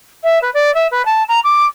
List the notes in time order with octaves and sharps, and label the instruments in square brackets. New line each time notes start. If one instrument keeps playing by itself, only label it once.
[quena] E5
B4
D5
E5
B4
A5
A#5
D6